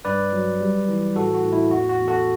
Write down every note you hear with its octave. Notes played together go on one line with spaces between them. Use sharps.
G2 B4 D5
F#3
G3
E3
A2 F#4 A4
F#4
A2
E4
E2 F#4
F#4
E2
F#4 A4